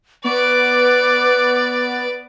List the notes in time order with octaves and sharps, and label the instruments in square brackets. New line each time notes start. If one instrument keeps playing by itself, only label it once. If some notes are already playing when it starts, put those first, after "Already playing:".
[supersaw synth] B3 [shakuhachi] B4 [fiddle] D5 [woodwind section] C#6 D6